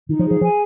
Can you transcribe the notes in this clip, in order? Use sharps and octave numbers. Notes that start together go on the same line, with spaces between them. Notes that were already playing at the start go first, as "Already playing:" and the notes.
D#3 D#4
F3
G#4
F3
F3 G#5